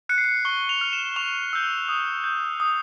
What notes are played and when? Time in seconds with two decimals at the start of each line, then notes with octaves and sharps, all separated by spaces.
0.09 F#6 C#7
0.18 C7
0.24 C#7
0.45 C#6 G7
0.69 F7
0.81 F6
0.93 E7
1.16 C#6 F7
1.53 E6 G6
1.89 D#6
2.24 G6
2.60 D#6